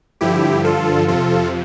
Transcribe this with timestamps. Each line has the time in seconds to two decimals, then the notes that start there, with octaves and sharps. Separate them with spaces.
0.21 G2 D3 F3 E4 G4
0.64 F4 A4
1.08 F2 C3 F3 F4 A4